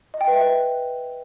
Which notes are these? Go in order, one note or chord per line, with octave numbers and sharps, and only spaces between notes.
D#5
G5
B4
E5
B4